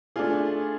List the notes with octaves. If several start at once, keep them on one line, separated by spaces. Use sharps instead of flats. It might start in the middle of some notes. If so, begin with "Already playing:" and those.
A3 D4 F4 G#4